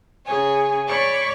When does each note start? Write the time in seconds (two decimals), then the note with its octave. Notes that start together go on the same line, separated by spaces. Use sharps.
0.24 C#3 G#4 C#5 G#5
0.87 C#5 D5 B5 C#6 D6